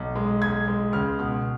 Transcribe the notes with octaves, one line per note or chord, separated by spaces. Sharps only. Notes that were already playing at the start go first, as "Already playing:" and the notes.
Already playing: B1
G#3
B1 G#6
G#3
C#2 F6
B2